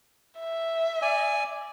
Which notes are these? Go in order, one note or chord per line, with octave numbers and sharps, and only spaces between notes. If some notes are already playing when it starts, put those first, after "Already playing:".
E5
D5 G#5